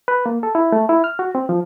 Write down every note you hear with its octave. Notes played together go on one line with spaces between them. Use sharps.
B4
A#3
A4
E4
A3
E4
F6
F#4
C4
F3